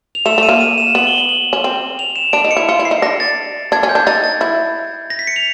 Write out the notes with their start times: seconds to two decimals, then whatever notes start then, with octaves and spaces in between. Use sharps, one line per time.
0.15 F7
0.26 A3 E7
0.38 A3 D#7
0.49 A#3
0.61 D#7
0.78 E7
0.95 B3 F#7
1.07 G7
1.18 F#7
1.29 F#7
1.53 C#4
1.64 C4
1.99 F7
2.16 E7
2.33 D4 D7
2.44 D#4
2.51 C#7
2.57 E4
2.68 F4 C#7
2.79 E4
2.85 C7
2.91 D#4
3.02 D4 A#6
3.20 A6
3.72 D4 G#6
3.83 C#4
3.89 G6
3.95 D4
4.07 D#4 A6
4.24 A6
4.41 E4
5.10 A#6
5.19 B6
5.27 C#7
5.36 F7